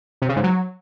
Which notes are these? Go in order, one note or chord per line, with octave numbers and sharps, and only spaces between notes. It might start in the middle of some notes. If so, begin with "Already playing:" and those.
C3
C#3
G#2
F#3